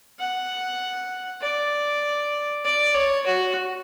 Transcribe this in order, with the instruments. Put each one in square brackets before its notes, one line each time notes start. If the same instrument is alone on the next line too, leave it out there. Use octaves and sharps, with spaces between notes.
[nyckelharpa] F#5
D5
D5
C#5
F#4